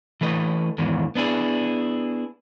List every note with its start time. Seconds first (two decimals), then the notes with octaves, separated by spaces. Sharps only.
0.21 E3 A3 B4 D#5
0.78 E2 G#2 D#3 E3
1.15 B3 D4 E4 G#4